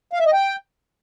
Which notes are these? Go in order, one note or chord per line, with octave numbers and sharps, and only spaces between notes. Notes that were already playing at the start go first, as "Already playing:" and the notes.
F5
E5
D#5
G5